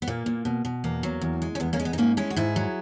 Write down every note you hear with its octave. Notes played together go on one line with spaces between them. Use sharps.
B3
A#2 A#3
A#2
B2
B2
E2 A#3
F#3
E2
G#3
C#4
E2 B3
A#3 C#4
G#3
B3
D#4
G#2 A#3 C#4
G#3 C#4 E4
F#4
G#2 E4 G#4
F#3